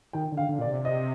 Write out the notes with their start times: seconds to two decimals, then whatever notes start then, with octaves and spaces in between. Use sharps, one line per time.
0.13 D#3 G5
0.32 D3
0.37 F5
0.49 D3
0.59 A#2 D5
0.67 C3
0.85 D#5